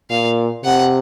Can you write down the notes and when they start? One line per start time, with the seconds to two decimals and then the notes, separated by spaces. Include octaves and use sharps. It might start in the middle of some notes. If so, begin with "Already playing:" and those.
0.10 A#2 F5
0.65 C3 F#5